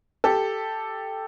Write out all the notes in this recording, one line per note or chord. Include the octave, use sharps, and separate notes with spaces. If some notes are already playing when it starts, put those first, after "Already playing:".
G4 A4